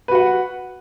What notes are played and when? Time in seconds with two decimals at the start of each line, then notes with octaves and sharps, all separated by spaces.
0.08 B4
0.12 F#4
0.15 F#5